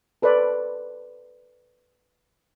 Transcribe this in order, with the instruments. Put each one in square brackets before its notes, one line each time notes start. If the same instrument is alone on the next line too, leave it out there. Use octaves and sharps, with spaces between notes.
[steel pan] A4 B4 C5 D5